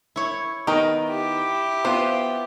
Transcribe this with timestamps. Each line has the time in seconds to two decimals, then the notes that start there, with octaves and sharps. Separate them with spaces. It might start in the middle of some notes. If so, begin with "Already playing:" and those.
0.16 E4 C#5
0.67 D#3 B3 D#4 A#4 G5
1.06 E4 G4
1.85 B3 F4 C5